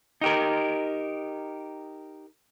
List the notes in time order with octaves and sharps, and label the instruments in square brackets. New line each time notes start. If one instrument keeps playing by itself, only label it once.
[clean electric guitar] D#4 G4 A#4